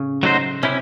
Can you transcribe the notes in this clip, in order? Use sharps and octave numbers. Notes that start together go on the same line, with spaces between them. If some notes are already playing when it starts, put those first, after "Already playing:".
Already playing: A2 C#3
F#3 A3 D#4 F#4 C5
C3 C#4 E4